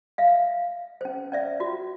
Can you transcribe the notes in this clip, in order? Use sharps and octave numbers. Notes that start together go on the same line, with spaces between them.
E5 F5
C#4 C5
C#4 D5 E5
F4 F#4